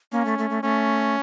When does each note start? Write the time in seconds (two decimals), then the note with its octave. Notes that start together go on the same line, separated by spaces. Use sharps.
0.12 A#3 C#4
0.25 A3
0.38 A3
0.50 A3
0.63 A3 C#4